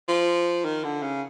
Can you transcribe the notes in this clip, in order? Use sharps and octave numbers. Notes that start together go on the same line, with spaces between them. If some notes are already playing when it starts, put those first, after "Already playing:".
F3
D#3
D3
C#3